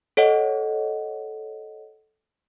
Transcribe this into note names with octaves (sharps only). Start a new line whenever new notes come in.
A4 C#5 D#5 F#5